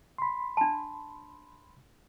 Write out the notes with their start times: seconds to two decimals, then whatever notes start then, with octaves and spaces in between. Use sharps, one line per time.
0.18 B5 C6
0.57 D4 A5